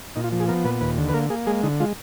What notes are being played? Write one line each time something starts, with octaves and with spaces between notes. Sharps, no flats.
A#2 D#4
F4
F3
G#4
B3 A#4
A#2 B4
D#2 B4
D3
B4
A#3 A#4
A#3 G#4
G#3 G#4
D3 D#4
G#3 F4